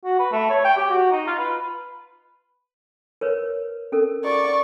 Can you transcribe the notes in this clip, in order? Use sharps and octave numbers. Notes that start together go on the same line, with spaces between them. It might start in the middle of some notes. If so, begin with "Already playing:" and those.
F#4
B4
A3
C#5
G5
G4
F#4
D#4
F4
B4
A#4 B4 C#5
C#4 A4 A#4
D5 C#6